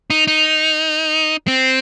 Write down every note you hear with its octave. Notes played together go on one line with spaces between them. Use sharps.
D#4
D#4
C4